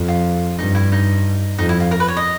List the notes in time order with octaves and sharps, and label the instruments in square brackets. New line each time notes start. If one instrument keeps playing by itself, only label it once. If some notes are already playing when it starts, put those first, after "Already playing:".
Already playing: [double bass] F2
[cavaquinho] F4
[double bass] G2 [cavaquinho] D#4
[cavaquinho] E4
D#4
[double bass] F2 [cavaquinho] D#4
[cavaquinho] E4
F4
A#4
B4
C#5
D#5